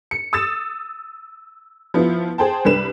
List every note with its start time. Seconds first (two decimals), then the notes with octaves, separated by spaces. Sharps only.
0.11 C#7
0.33 D#6 E6 A6 E7
1.94 F3 B3 E4 F4
2.38 G#4 C5 G5 A5
2.65 C2 D4 B4 E7